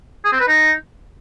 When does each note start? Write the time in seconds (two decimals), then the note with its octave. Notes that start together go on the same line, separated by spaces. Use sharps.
0.25 G#4
0.33 C4
0.40 B4
0.48 D#4